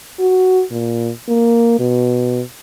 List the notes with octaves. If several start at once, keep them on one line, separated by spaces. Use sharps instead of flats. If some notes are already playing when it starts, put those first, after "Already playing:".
F#4
A#2
A#3
B2